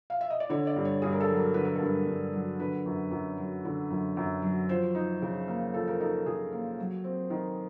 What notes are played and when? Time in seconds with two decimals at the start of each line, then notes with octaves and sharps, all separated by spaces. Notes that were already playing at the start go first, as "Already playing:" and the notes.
0.10 F5
0.21 E5
0.30 D#5
0.40 D5
0.50 D3 C#5
0.67 D5
0.76 G2
0.85 C#5
1.02 G2 G#4
1.13 A#4
1.20 A4
1.29 F#3
1.37 A#4
1.54 D3 B4
1.65 A#4
1.76 A4
1.81 G2 A#4
2.07 G2
2.33 F#3
2.59 D3 B4
2.86 F#2
3.11 F#2
3.37 F#3
3.65 D3
3.91 F#2
4.17 F#2
4.42 F#3
4.69 F3 C5
4.95 D#4
5.22 C#3
5.48 A#3
5.74 F3 A4
5.88 A#4
6.00 D#4 A4
6.26 C#3 G#4
6.52 A#3
6.79 F#3
7.04 C4
7.30 D#3